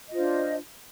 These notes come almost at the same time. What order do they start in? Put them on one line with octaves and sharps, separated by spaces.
D#5 F4 C5 D4